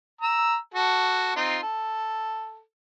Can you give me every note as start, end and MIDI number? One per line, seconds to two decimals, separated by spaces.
0.21 0.56 82
0.21 0.56 88
0.74 1.36 66
0.74 1.36 69
1.36 1.58 60
1.36 1.58 63
1.36 1.58 65
1.62 2.61 69